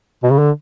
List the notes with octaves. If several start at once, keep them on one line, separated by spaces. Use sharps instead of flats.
B2
C#3
D3